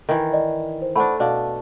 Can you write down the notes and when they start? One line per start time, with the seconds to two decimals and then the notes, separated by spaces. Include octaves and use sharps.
0.09 D#3 E3
0.33 D5 D#5
0.82 C5
0.96 A3 D4 C5 F#5 B5
1.20 B2 D4 D5 F5